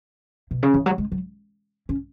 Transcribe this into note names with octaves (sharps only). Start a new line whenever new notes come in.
B2
C#3
E3
F#3
G#3
F#3
C#4